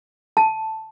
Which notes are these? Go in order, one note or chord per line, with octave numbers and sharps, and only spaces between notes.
A5